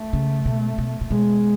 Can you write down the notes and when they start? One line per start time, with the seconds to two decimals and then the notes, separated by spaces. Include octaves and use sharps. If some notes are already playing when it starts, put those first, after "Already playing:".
Already playing: A3
0.13 C#3
0.45 B2
0.78 B2
1.01 A#2
1.10 B2 G#3